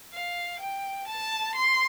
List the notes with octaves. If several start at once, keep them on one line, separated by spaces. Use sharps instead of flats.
F5
G5
A5
C6